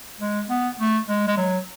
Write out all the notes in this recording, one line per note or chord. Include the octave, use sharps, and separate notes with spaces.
G#3
B3
A3
G#3
G#3
F#3